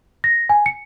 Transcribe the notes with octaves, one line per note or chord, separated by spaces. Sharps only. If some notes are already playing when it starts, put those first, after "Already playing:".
A#6
G#5
C#7